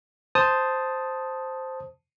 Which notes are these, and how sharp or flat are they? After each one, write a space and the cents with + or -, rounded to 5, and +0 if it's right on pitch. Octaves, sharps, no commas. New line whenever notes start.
C5 +0 A5 +0 D#6 +0